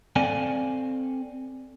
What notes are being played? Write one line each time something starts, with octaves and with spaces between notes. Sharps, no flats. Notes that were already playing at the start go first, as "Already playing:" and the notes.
C4 A4 D5 F5 G#5